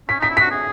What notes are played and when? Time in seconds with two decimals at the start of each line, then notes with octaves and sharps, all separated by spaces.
0.09 C#4 B6
0.19 D#4 B6
0.30 E4
0.37 F#4 B6
0.51 G#4